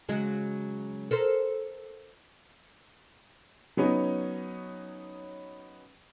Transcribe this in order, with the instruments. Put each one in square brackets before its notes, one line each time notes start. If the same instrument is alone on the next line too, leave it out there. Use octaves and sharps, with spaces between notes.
[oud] C#3 F#3 G#3
A4 A#4 C5
[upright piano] F#3 B3 C#4 D#4